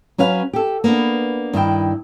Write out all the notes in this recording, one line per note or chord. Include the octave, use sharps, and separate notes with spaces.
F#3 C#4 B4 F5
G4 A4
A#3 B3 D4
G2 D#3 E4 G5